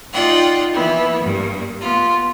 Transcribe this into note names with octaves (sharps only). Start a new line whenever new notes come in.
D#4 F4 D5 F#5 G5
E3 A#3 B3 E4
G2 A#3
B3 F4